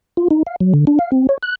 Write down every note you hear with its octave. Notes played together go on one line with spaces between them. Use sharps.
F4
D#4
F5
F#3
D3
D4
F5
C4
C#5
F#6